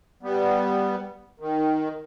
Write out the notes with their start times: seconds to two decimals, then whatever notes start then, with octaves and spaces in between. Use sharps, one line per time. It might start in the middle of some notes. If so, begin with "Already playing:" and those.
0.23 G3 B3
1.39 D#3